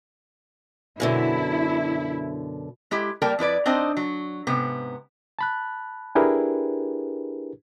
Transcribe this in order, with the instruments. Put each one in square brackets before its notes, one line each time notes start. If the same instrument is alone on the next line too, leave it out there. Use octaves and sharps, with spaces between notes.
[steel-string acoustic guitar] F#2 B2 D3 [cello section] E4
[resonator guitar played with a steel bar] G#3 E4 G4
G3 A#3 A#4 D5 G5 A5
F2 E4 B4 D5
C4 D4 D#4 C5 D#5
F#3
G#2 C3 B3
[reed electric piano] A5 B5 F#6
D4 E4 G4 G#4 A#4 B4